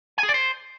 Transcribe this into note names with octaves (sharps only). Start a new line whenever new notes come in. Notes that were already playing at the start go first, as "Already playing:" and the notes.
G#5
G#4
D5
C5